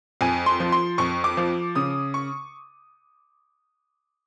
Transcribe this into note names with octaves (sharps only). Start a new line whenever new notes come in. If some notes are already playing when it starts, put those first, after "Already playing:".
F2 G#5
C6
F3
C6
F2 C#6
D6
F3
C#3 D#6
C#6